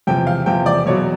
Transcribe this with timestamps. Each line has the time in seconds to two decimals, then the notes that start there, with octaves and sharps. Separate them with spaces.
0.07 E2 C3 F3 G5
0.27 F5
0.46 E2 C3 F3 G5
0.66 D5
0.86 E2 B2 F#3 C#5